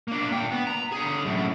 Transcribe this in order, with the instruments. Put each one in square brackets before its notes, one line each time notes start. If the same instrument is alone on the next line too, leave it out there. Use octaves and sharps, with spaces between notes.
[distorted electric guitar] A#3 D4
A#2 G5
B3
A#5
D3 G#4
F#2 A2